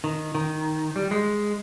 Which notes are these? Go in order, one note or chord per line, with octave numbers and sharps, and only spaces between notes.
D#3
D#3
G3
G#3